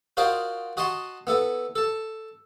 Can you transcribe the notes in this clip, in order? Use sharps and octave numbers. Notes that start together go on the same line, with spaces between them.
F4 F#4 A#4 C5 D5 D#5
F#4 D#5 G#5 A5 C6 C#6
B3 E4 A4
A4 A5